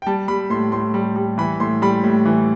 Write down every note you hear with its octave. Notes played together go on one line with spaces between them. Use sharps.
G5
G3 A5
G3 B5
A2 C6
A2 C6
G3
G3
E3 B5
A2 C6
G3 B5
A2
E3